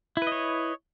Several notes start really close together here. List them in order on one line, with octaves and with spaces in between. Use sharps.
E4 B4 D#5 C#5